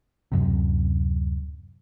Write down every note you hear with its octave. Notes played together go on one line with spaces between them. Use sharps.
D1 F#2 C3